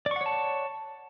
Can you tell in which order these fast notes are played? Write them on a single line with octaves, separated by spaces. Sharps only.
D5 C#6 F#5 C#5 A5